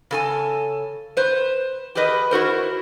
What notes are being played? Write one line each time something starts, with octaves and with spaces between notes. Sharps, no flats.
C#3 A4 G#5
B4 C5
G4 G#4 A#4 B4 D#5
E4 F#4 A#4 C5